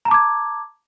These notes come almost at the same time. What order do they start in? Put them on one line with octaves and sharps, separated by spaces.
A#5 A5 D6 G#6